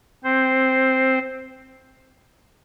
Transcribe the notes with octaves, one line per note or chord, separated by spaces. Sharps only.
C4 C5